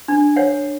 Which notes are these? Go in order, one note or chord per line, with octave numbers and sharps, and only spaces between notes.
D4
C#5 F#5